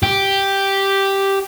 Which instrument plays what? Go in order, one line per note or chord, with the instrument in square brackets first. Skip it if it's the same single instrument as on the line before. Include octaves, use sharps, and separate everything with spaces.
[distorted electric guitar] G4